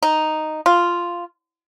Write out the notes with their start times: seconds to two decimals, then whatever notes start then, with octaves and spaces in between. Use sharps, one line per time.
0.03 D#4
0.66 F4